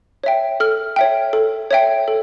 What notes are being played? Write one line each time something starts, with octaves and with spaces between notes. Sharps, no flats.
C#5 E5 G5
A4 F6
C#5 E5 G5
A4
C#5 E5 G5
A4